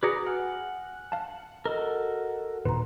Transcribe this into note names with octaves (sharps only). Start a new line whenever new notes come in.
F#4 G#4 B4 D5 A#5 D#6 G#6 C#7
F#5 G#5 F6
F5 A5
F#4 A4 A#4 D#5
D#1 A#2 D#3 B4 A#5 C6